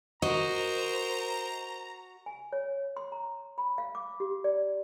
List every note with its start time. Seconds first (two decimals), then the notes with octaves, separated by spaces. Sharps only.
0.22 F#4 A#4 C5 D#5 A#5
2.26 G#5
2.53 C#5
2.97 C6
3.12 A#5
3.58 B5
3.78 F5
3.95 D6
4.20 G4
4.44 D5